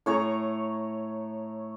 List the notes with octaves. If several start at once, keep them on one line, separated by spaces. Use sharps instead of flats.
A2 C#5 A#5 C#6